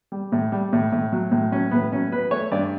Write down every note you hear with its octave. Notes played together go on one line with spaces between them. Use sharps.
G3
A2
G3
A2
A2
F#3
A2
F#3 C#4
A2 B3
F#3 C#4
B3 B4
A3 C#5
G2 D5